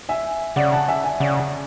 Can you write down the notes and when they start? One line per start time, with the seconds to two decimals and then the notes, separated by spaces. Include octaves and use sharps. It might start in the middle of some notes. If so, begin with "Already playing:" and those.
0.09 E5 G#5
0.56 C#3 D5 F#5
0.72 F#5 A5
0.88 E5 G#5
1.04 E5 G#5
1.20 C#3 D5 F#5